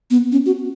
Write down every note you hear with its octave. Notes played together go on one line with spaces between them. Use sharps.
B3
C#4
F#4